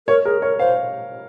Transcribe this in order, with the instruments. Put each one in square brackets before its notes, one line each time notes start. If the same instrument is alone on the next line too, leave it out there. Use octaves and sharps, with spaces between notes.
[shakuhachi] A#4 [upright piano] C#5
[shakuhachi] G#4 [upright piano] A#4
[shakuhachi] A#4 [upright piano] C#5
[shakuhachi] C5 [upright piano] F5